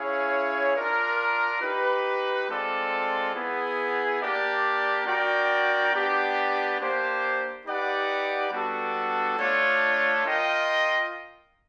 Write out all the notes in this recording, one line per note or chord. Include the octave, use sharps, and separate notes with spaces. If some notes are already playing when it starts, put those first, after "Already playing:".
Already playing: C#4 E4 G#4 C#5 F5
D4 F4 A#4
D#4 G4 B4
G#3 C4 F4 A4 D5
B3 E4 G#4
A#3 D4 G4 A#4 D5
D4 F#4 A#4 D5 G5
B3 D4 G4
A#3 D4 G4 C5
D#4 G4 B4 D5 F#5
G3 B3 D4 F#4 A4
A3 D4 F4 A4 C#5
F4 A#4 D#5 G5